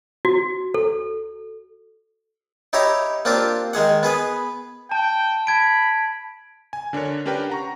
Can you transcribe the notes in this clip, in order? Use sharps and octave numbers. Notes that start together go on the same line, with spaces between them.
F#4
A4
D#4 E4 G4 C#5 A#5
A#3 C4 D4 F4 G4
D#3 G#3 G#4 F#5
B3 G#4 B4
G5 A5
A5 B5 G#6 D7
G#5
D3 D4 A#4 C#5
C#4 D4 G4 A#4 B4 G5
F#5 A#5 C#6